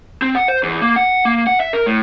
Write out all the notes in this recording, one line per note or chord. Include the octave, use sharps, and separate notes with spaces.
C4
F#5
C5
E2
A#3
F#5
A#3
F#5
E5
A#4
A2